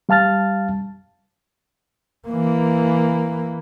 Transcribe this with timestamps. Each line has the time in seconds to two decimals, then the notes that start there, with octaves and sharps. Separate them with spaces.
0.09 G3 F5 A5 F6 A6
2.28 E3 A#3